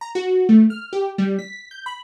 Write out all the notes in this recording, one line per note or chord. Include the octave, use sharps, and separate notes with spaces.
A#5
F#4
A3
F6
G4
G3
B6
G6
B5